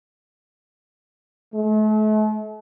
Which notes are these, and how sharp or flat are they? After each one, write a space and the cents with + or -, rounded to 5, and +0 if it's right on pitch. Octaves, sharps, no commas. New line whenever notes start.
A3 -40